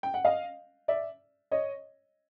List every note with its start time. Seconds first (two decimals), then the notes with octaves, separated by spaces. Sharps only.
0.03 G5
0.14 F#5
0.25 D#5 F5
0.88 D5 E5
1.51 C#5 D#5